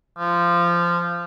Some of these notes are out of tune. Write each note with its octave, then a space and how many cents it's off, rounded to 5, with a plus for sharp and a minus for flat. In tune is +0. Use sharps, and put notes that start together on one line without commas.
F3 -15